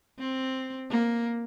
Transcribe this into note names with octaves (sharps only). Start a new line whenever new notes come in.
C4
A#3